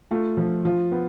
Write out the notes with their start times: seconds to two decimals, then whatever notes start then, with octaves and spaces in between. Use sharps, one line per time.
0.11 A3 F4
0.37 F3
0.65 F3 F4
0.92 B3